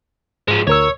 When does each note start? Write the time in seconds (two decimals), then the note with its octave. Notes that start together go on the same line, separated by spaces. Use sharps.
0.48 G#2 F3 G#3
0.67 D2 A#4 C#5 E6